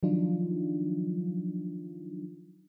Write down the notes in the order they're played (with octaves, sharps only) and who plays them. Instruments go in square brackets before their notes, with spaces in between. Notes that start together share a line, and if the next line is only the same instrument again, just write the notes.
[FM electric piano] D#3 F3 F#3 D4 D#4 F4